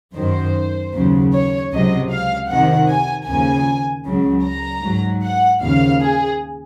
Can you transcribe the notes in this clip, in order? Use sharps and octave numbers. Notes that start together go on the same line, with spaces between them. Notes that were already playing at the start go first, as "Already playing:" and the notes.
F#2 D#3 F#3 C5
D#2 C#3 F#3
C#5
C#2 C3 F#3 D#5
F5
F2 C3 D#3 F#5
G#5
D#2 C#3 F3 G#5
C#2 C#3 F#3
A#5
G#2 F#3
F#5
D#2 C#3 F3 F5
G#4